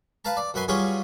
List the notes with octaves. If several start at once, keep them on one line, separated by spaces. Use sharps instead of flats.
B4 F5 A5 A#5
D5
F#2 F#3 B4 G#5 C6
F#3 G3 C#4 F4 G#4 B4